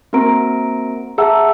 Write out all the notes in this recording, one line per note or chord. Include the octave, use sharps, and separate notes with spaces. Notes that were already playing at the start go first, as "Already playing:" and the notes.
A#3 C4 F#4 A#4 A#5 D7
G#4 E5 F#5 A5 A#5 E6